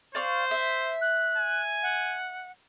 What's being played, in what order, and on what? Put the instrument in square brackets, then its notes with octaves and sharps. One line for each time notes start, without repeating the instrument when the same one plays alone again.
[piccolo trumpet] C5 [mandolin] D5 F5 C#6
[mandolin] E5
[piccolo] F#6
[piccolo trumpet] G#5
[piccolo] F#5